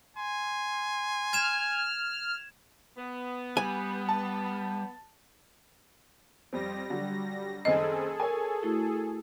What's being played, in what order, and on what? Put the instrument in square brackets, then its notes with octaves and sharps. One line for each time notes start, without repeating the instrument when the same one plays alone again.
[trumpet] G#5 [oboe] C6
[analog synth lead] F6 [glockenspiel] G#6 E7
[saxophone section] B3
[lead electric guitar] G3 [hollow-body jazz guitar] G#5
[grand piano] A5
[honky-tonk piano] F2 C4 [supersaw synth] G3 A#6
[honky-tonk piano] D3 F#3
[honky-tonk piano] F#1 D#3 C4 [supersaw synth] G#4 A4 [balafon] D#5
[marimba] A#4 [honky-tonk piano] C#5 G#5
[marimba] A3 E4 F#4